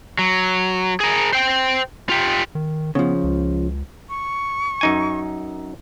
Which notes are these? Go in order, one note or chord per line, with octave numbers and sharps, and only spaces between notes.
F#3
G#4 A#4
C5 G5
F4 G4
D#3
C#3 F3 B3
C#2
C#6
F#2 D#4 G#5